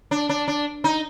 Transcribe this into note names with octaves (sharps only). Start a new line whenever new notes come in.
D4
D4
D4
D#4